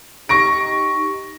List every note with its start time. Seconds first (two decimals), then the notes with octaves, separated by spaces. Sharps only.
0.29 D#4 G4 C#6 A#6 D7